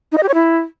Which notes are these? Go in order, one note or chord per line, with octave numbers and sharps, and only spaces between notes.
D#4
D#5
G4
C#5
E4